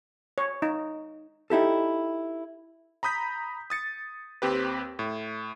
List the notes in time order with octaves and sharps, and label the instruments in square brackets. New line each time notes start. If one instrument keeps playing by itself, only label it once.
[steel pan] C#5
D#4
[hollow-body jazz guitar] D#4 E4 G4 A4
[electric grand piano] A#5 B5 D#6 G6 B6
D#6 A6 C#7
D#2 C4 G4 B4
A2